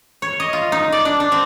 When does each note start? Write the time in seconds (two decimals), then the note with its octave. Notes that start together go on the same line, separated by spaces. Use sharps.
0.22 C#5
0.40 D#5
0.53 F4
0.72 D#4
0.92 D5
1.05 D4
1.20 D4
1.32 C4